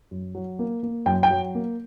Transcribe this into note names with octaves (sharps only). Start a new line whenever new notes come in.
F#2
F#3
A#3
A#3
F#2 G5
G5
F#3
A#3